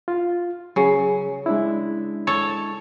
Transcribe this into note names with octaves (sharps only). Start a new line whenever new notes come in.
F4
C#3 F#3
G#3 D4 E4
A4 C#5